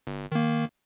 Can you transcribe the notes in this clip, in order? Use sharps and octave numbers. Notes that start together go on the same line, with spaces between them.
G1
D#3 A#3